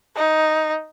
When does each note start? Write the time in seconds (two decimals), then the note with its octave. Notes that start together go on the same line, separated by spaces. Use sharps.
0.16 D#4